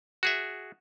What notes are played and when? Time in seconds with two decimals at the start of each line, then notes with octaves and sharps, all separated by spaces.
0.23 F#4 G#4 E5